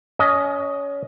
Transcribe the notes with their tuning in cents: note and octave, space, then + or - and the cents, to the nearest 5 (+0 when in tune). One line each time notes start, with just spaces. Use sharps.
C#4 +25 D#5 +0